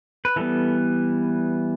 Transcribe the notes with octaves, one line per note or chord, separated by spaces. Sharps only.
B4
E3 G3 B3 A4